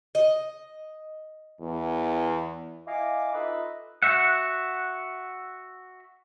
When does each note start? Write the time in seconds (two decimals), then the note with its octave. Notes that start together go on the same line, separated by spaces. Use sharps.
0.15 D#5
1.61 E2
2.87 E4 D#5 F5 G#5 D6
3.34 D#4 F4 A4 B4 D#5 E5
4.02 F#4 E5 F#5